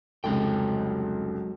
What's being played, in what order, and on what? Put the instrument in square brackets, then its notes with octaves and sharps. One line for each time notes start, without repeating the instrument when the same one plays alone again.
[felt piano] F1 C#2 [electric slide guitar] F#3 G#3 G5